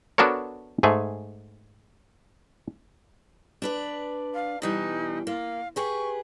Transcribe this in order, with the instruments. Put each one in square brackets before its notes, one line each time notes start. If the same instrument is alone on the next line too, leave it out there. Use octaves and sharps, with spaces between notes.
[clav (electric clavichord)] B3 D4 F#4 A4 A#4 C#5
G#2 A3 G#4
[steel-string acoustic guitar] D4 B4 D5
[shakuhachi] F5
[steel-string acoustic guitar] B2 E3 G3 [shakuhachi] D#4
[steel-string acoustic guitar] A#3 [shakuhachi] F5
[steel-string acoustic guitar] G4 G#4 B4 [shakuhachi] C#6